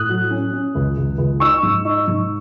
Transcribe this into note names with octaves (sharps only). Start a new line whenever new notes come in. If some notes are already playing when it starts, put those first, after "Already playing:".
Already playing: A2 D#6 F#6
F#3
C#4
C#4
C#2
C#2
C#2
D#4 C#6 E6
G#2
D#4
G#2